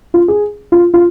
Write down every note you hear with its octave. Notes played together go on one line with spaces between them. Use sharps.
F4
G#4
F4
F4